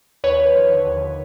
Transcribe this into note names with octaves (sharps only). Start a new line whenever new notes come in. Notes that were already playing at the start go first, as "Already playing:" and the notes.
D#2 B4 C#5
D#2
F3
D3
D#2